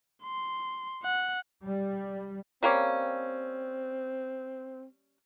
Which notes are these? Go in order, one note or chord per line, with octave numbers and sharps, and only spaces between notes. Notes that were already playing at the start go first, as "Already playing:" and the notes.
C6
F#5
G3
G3 A#3 C4 C#4